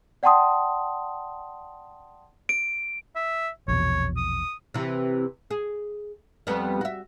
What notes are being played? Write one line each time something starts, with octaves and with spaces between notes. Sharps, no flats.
D5 F#5 G5 A5 C6 D#6
D7
E5
A#1 E2 B2 C#5
D#6
C3 E3
G#4
F2 G3 B3
F#4 E5